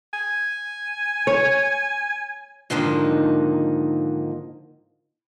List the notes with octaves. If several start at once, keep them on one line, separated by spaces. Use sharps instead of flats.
G#5
C#5
G#2 D3 D#3 F3 A#3 D#4